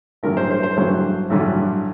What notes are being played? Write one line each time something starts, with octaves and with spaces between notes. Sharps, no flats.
A1 G2 D3 F#3 A#4
C5
C5
C5
A1 G2 D3 F#3 C5
A1 G2 D3 F#3